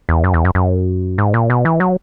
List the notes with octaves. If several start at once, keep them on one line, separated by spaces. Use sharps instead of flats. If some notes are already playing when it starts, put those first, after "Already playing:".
E2
F#2
E2
F#2
F#2
G#2
A#2
B2
E3
F#3